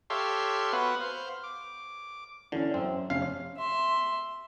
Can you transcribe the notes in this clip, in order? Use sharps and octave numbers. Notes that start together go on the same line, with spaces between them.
G4 A4 C#5 E5 F5 C6
B3 F#4 B4
C5 F5
D6
D3 E3 C#4
F#2 C4
F1 C#4 F5 C7
E5 C6